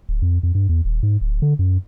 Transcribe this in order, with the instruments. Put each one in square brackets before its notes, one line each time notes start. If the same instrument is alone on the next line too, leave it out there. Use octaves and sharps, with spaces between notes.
[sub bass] D1
F2
F2
G2
E2
D#1
G#2
D1
D3
F#2